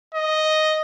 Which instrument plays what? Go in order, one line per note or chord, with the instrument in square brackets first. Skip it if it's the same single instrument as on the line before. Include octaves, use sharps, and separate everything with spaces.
[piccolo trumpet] D#5